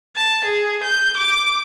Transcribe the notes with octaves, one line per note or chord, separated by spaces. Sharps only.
A5
G#4
G6
D6